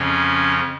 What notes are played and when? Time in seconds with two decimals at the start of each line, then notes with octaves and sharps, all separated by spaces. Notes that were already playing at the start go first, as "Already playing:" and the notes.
Already playing: F2 C#3 F3 C#4